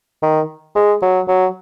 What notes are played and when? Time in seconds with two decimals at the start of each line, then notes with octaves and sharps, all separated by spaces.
0.22 D#3
0.75 G#3
1.02 F#3
1.28 F#3